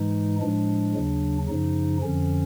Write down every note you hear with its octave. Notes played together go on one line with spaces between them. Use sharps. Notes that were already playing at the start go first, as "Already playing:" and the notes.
Already playing: G#2 E3 G#3 D#4
A2 F3 G#3 D4
D#2 C#3 F#3
F#2 C#3 F3 D#4
F2 D3 F3 C#4